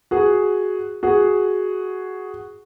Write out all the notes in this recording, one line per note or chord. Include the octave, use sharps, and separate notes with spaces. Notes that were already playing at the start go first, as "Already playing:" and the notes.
F#4 G#4
F#4 G#4